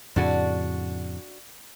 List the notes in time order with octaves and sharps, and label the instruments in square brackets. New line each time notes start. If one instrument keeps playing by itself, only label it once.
[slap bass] F2 A2 C#3 [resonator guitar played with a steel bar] D4 F#4